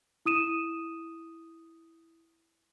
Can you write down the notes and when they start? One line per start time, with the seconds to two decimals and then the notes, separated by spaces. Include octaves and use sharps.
0.26 E4 D#6 D#7 E7